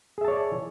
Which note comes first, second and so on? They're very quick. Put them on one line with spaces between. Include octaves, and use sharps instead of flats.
G#4 E5 A5 C#5 D5